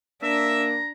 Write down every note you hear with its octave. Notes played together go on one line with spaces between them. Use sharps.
A#3 D4 E5 A#5